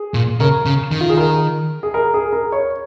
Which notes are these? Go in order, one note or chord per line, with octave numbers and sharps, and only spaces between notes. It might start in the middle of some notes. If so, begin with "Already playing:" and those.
Already playing: G#4
A#2
C#3 A#4
C#3
D#3
F4
G#4
A#4
G#4
A#4
G#4
A#4
C#5